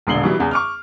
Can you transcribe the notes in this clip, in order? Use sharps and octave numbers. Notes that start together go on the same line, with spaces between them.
E1 A#1 D3 C7 F#7 G7
B2 E3 G3
E2 C#3
C#6 D6 F6